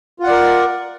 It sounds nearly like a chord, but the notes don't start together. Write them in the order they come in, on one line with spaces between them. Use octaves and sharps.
F4 F#5 D5 A#4